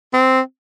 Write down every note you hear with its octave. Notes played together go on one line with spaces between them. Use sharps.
C4